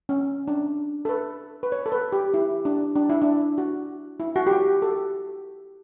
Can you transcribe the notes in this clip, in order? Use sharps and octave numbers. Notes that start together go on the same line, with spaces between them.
C#4
D4
A4
B4
B4
C#5
A4
B4
G4
E4
D4
D4
E4
D4
F#4
E4
F#4
G4
F#4
A4